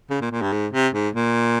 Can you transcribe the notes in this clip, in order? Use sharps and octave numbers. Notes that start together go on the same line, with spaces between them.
C#3
A#2
A#2
G2
G#2
C3
G#2
A#2